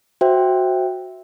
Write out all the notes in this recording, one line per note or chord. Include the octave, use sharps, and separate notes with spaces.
F#4 C5 E5 G5